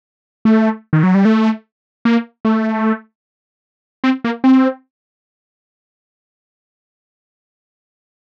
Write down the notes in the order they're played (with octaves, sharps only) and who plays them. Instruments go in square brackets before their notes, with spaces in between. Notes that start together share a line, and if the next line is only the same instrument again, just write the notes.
[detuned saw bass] A3
D#3
F#3
G3
A3
A#3
A3
C4
A#3
C4